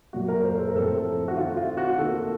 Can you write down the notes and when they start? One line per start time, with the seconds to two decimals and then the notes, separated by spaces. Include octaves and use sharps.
0.13 A#2 F#3 A#3 F#4
0.28 A#4
0.44 C5
0.59 A4
0.68 A#4
0.75 A2 F3 C4 A4
1.28 F#4
1.36 D#3 A3 C4 F4
1.57 F4
1.77 F#4
1.98 D#3 A#3 A4